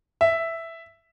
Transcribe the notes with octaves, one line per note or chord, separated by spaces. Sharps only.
E5